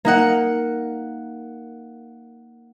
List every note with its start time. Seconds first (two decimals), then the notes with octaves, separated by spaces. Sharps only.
0.05 A#3 D#4 F#5